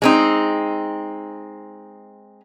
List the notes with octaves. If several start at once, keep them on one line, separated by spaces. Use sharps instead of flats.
G#3 C4 D#4